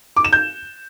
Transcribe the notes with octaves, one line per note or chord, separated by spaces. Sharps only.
D6
E7
G6